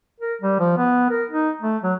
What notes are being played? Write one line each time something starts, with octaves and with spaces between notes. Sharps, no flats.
A#4
G3
F3
B3
A#4
D#4
A3
F#3